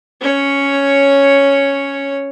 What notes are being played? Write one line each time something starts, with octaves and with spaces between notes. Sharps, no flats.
C#4 C#5